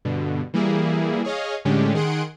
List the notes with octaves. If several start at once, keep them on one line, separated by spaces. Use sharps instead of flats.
G2 B2 D3
E3 G3 A#3 E4 G#4
G#4 C#5 D#5 F5
A2 D3 G#3 C#4 D4 G4
D#3 G#4 F#5 C6 D7